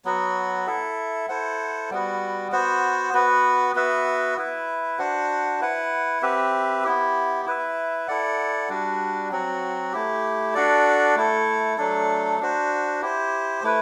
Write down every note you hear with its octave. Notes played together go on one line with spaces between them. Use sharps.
F#3 B3 F#4
E4 A4 E5
E4 A4 C5 F#5
G3 B3 F#4
B3 F#4 C5
B3 F#4 B4
B3 F#4 B4 E5
E4 B4 E5
D4 F#4 C5 F#5
E4 B4 F#5
C4 G4 B4 E5
B3 E4 G4
E4 B4 E5
E4 A4 D5 F#5
G3 D4 F#4
F#3 C4 F#4
A3 E4 G4
D4 F#4 A4 D5
A3 E4 A4
F#3 A3 D4 A4
D4 F#4 C5
E4 G4 C5
A3 E4 B4